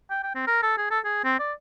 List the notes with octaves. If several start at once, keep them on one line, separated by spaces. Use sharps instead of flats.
G5
G5
C4
A#4
A4
G#4
A4
G#4
C4
D5